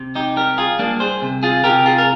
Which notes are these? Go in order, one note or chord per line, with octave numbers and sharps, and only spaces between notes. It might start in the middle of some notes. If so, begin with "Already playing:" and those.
Already playing: C3
D#4 G4
G3 G4 A#4
F4 G#4
G3 A#3 D4
G#4 C5
C3
F4 G#4
C3 G4 A#4
F4 G#4
A#4